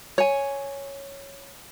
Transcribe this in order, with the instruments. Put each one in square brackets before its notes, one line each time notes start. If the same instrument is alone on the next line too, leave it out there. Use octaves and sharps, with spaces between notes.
[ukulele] C#5 G#5